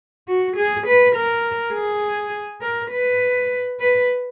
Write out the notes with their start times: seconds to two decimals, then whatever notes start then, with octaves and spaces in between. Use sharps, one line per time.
0.28 F#4
0.56 G#4
0.86 B4
1.16 A#4
1.73 G#4
2.61 A#4
2.91 B4
3.80 B4